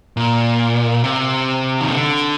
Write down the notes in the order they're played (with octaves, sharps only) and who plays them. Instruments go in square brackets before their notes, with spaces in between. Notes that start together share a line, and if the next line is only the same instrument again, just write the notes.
[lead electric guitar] A#2
C3
D#3
D3